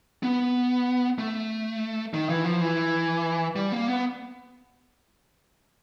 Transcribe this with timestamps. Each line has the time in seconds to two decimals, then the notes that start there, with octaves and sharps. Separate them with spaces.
0.23 B3
1.18 A3
2.14 D#3
2.29 E3
2.45 F3
2.61 E3
3.56 G3
3.72 A#3
3.88 B3